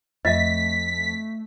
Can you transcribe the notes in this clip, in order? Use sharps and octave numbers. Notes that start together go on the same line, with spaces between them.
F2 A3 D#5 E5 B6